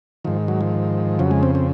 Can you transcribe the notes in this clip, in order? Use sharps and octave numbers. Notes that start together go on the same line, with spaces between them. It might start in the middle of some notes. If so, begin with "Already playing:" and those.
G#2 D#3 F3
F#3
F3
F2 C#3 F#3
G#3
C4
C4